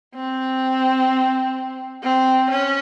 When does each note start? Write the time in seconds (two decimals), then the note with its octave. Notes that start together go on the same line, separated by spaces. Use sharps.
0.15 C4
2.03 C4
2.50 C#4